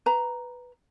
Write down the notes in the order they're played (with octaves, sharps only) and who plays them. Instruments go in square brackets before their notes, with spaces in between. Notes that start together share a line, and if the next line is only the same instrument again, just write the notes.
[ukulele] B4 A#5